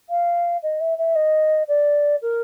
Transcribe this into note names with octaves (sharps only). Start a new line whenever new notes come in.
F5
D#5
E5
E5
D#5
D5
A#4